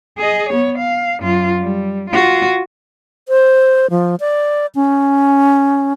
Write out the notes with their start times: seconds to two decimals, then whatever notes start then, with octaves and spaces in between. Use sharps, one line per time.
0.18 G#4 D#5
0.50 B3 C#5
0.78 F5
1.21 F#2 F4
1.61 G3
2.10 F4 F#4
3.29 C5
3.91 F3
4.20 D5
4.75 C#4